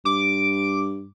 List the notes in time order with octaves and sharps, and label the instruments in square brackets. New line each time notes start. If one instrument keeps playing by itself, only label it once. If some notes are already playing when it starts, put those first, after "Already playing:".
[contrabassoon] G2 [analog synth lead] D6